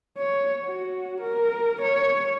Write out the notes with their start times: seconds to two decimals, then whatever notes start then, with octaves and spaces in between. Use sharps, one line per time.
0.18 C#5
0.66 F#4
1.21 A#4
1.82 C#5